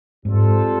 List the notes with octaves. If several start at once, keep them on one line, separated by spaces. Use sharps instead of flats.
G#2 G3 C4 F4 A4 C5